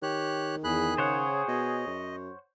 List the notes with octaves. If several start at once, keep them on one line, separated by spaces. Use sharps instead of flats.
D#3 G4 C#5 F#6
E2 G#4 B5 F#6
C#3 C5 C#5 F#5
B2 D#5
F#2